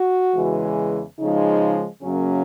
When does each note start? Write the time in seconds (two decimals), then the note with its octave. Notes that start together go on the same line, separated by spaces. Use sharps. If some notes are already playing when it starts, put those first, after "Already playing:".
Already playing: F#4
0.35 E2 C#3 E3 G#3
1.18 C#3 F3 G#3 D#4
2.02 F#2 C#3 F#3 A#3 C#4